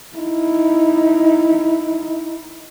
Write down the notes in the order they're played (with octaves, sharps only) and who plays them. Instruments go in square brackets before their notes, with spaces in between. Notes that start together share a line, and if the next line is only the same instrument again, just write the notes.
[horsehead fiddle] D#4 E4